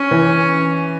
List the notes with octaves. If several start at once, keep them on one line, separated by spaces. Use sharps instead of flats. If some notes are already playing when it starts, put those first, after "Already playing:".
Already playing: C#4
E3